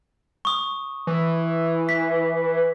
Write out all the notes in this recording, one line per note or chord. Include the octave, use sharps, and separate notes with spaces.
C#6 D#6
E3
B6